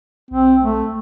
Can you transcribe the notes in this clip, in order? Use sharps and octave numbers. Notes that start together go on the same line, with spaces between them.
B1 C4
A3